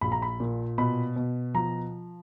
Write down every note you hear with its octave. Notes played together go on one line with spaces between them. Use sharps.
A#1 B5
A#5
B5
A#2
B2 B5
B2
F3 A#5